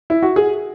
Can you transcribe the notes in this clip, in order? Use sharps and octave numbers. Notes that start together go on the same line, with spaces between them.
E4
F#4
G#4